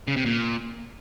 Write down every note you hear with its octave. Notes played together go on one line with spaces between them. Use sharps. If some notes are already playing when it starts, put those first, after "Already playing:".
C#3
C3
A#2